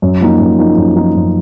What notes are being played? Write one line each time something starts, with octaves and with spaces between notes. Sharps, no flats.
F#2
F3 A#3 D#4
F#2
F3 A#3 D#4
F#2
F3 A#3 D#4
F#2